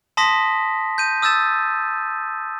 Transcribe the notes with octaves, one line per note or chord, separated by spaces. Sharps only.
A5 C6 D#6 A#6 B6
G6 D#7
D#6 E6 G6 A6 E7